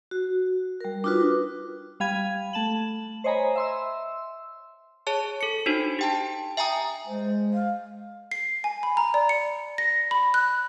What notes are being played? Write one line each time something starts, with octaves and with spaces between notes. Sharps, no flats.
F#4
G3 A#4
D4 D#4 F4 F#4 B4
G3 F5 B5 G#6 D#7
A3 A5 E7 F#7
C5 C#5 D#5 G#5 A#5 B5
E5 C6 E6
G#4 C#5 A5
A4 C#7
D4 D#4 F#4 C5
G4 G5 A5
E5 G5 G#5 A#5 D#6
G#3 C5
F5
C7
G#5
B5
A#5
D5
C#7
A#6
B5
F#6